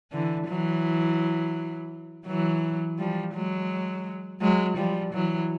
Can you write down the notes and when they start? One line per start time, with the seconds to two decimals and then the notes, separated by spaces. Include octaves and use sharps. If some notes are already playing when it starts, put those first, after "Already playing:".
0.12 D3 E3
0.48 E3 F#3
2.27 E3 F#3
2.98 F3 G3
3.34 F#3 G#3
4.41 F#3 G#3
4.77 F3 G3
5.13 E3 F#3